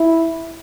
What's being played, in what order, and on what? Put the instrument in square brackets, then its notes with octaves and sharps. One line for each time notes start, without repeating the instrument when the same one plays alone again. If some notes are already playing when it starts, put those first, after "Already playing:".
Already playing: [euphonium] E4